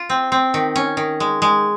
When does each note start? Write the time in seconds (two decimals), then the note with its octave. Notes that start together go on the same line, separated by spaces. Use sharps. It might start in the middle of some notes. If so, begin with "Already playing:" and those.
Already playing: F4
0.10 C4
0.32 C4
0.54 D#3
0.76 C#4
0.97 D#3
1.20 G#3
1.42 G#3